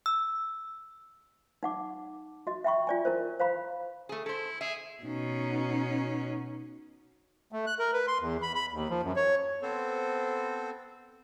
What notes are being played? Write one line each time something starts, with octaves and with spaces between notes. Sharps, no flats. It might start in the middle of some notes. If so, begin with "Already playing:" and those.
E6
D#4 F#5 D6
F#4 D#5
E5 G5 B5 C#6
F4 D5 G#5
E4 A#4 C5
C5 F5 A#5 B5
A3 G#4
E4 A4 C5
G#4 E5
B2 C#4 D#4
A3
F#6
A#4
B4
C6
E2
B5
B5
D#2
F3
F#2
C#5
B3 C4 A4 C5